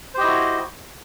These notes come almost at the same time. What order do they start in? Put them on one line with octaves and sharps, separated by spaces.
C5 G4 D#5 E4 F#4